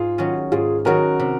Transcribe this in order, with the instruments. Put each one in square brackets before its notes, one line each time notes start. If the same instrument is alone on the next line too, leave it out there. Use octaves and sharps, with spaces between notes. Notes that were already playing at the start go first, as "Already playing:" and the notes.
Already playing: [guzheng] G#2 [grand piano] F4 G#4
[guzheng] D#3 F#3 C#4
[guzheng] G#2 [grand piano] F4 G#4
[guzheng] D#3 F#3 C#4 [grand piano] F#4 A#4
[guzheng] C3